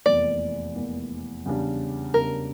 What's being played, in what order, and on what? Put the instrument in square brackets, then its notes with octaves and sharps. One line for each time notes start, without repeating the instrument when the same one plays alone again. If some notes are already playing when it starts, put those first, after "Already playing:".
[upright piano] F1 E2 E3 A#3 [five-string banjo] D5
[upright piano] F1 E2 E3 A#3
E2 C#3 G3 D4
[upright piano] E2 C#3 G3 D4 [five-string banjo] A#4